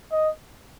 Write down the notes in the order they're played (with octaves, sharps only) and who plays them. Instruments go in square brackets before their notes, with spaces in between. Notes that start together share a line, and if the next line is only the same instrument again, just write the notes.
[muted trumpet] D#5